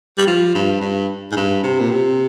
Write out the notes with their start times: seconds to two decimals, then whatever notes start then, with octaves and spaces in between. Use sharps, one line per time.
0.18 G3
0.27 F3
0.55 G2
0.81 G2
1.32 G#2
1.36 G2
1.64 C3
1.80 A#2
1.91 C3